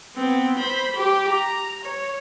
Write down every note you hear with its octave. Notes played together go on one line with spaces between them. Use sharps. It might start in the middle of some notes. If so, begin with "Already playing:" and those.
B3 C4
C5 B5
G4
A#5
C#5